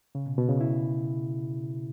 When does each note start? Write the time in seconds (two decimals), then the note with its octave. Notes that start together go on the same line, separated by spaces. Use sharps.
0.15 C#3
0.27 B2
0.38 B2
0.49 C#3
0.61 E4